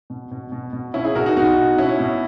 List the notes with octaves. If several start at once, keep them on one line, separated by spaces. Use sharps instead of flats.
B2
B2
B2
B2
B2 C#4 E4
E4 G#4
B2 F#4 A#4
D#4 F#4
B2 D#4 F#4
B2
B2 C#4 E4
B2